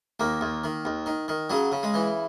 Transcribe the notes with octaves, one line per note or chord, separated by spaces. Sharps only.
D#2 A#3
D#2
D#3
D#2
D#3
D#3
C#3 F#3
C#3
G#3
E3